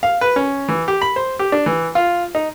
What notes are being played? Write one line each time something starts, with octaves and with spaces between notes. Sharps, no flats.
F5
B4
C#4
E3
G4
B5
C5
G4
D4
E3
F4
D#4